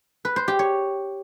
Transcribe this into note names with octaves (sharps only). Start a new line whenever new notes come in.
B4
C5
G4
C#5